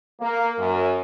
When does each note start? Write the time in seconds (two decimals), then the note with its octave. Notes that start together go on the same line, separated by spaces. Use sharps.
0.20 A#3
0.58 F#2